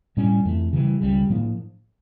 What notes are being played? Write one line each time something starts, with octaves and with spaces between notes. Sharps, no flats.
A2 G3 C#4
F2 E3 A3
C#3 E3 G3
C#2 C#3 G3
A2 F3 A#3 D4